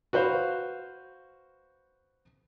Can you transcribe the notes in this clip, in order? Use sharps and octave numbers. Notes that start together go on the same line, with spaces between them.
F#4 B4 C5 F5